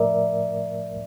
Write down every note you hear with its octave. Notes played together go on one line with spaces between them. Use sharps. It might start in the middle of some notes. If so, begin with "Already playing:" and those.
Already playing: A2 F3 A3 A#4 D5 E5